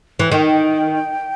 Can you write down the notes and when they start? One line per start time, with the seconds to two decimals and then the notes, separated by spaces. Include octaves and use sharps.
0.19 E3
0.31 D#3 G5